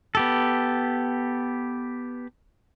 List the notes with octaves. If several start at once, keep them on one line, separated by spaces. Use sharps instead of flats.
B3 G4 A4